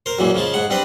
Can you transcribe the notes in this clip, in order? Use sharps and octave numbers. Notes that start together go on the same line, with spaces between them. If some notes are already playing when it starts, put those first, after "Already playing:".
A#4 C5
F#2 A#2 E3 G#3
C#3 F3 G#3 A5
G#2 G#3 F#5
G3 C4 D4 B4 C5